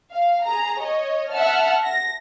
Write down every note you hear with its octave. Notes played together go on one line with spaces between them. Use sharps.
F5
G#4 A#5
C#5 D#5
E5 F#5 A5 F6
A#6